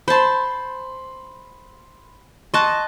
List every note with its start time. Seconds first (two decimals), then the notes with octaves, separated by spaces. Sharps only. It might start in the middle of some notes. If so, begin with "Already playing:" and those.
0.08 C5 A5 B5 C6
2.54 D#5 A5 C6 C#6 F#6